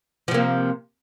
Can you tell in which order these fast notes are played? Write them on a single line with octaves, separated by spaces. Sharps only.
F3 C3 A#3